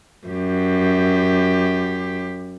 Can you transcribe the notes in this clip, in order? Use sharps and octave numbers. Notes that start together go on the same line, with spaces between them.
F#2 G4